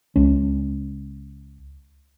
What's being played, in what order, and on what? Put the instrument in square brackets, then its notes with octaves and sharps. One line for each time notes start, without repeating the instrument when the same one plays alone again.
[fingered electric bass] C#2 C#4